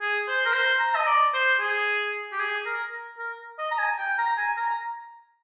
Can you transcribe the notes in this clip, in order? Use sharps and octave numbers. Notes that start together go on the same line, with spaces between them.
G#4
C5
A#4
C5
A#5
D#5
D5
C5
G#4
G4
G#4
A#4
A#4
D#5
A#5
G#5
G5
A#5
G#5
A#5